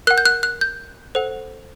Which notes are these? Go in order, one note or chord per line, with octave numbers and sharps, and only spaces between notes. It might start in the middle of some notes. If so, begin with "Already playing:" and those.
A#4 F#5 F#6
G6
F#6
F#6
G6
A4 C5 F#5